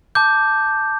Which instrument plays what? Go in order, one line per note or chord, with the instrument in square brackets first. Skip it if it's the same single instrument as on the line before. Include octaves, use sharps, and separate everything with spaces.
[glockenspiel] A5 D6 G6